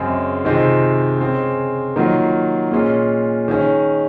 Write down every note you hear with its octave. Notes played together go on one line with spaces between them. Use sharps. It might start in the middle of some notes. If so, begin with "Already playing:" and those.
Already playing: F#2 C#3 G#3 C4
C3 D#3 G#3 C4 F4
C#3 G#3 C4
D#3 F#3 A#3 F4
A#2 G#3 C#4 F4
D#3 G#3 C#4